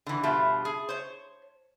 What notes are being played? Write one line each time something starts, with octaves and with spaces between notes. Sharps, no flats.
D3 E3
G2 B2 F3 A3
G#4
C5 C#5